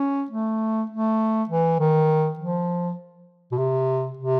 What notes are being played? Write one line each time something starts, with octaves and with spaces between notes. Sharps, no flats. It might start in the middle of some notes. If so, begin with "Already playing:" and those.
Already playing: C#4
A3
A3
E3
D#3
F3
B2
C3
C3